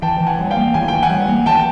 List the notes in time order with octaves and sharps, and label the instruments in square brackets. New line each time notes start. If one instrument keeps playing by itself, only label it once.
[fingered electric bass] E3 [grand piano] G5 A5
[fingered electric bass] E3
[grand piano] F#5 G#5
[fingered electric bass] G3
[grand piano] F5 G5
[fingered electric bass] A#3
[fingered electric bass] E3 [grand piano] G#5
[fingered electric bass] E3 [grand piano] G5
[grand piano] F#5 G#5
[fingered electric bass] G3
A#3
[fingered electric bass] E3 [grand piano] G5 A5